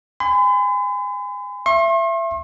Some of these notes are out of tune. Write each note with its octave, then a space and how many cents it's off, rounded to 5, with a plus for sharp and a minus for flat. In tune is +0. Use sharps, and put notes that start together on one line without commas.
G#5 -25 B5 +45
E5 +25 C6 +45